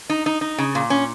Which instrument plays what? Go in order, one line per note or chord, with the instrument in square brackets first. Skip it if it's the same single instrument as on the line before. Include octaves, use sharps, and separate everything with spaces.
[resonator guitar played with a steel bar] D#4
D#4
D#4
C#3
A#2
C#4